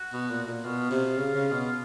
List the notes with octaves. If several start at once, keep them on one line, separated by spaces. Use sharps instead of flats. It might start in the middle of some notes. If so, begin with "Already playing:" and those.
Already playing: F#4
B2
A#2
A#2
B2 F4
C3
C#3
C#3
B2